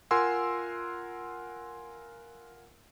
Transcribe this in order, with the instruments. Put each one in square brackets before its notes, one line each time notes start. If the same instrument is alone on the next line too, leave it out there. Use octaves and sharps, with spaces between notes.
[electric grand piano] F4 A#4 F#5 G#5 C6 E6